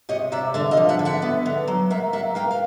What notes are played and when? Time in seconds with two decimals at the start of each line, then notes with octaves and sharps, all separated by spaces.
0.09 C3 C#5 D#5
0.32 C3 D5 E5
0.54 D3 D5 E5
0.71 D#5 F5
0.77 F3
0.89 E5 F#5
0.99 D3
1.05 E5 F#5
1.22 B3
1.46 D3
1.68 F#3
1.90 A#3 E5 F#5
2.13 A#3 E5 F#5
2.35 A#3 F5 G5
2.51 F5